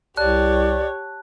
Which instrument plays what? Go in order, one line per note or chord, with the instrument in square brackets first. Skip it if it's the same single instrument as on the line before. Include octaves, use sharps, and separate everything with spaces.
[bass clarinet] C2 [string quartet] G4 C#5 [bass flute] D5 [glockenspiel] A5 F#6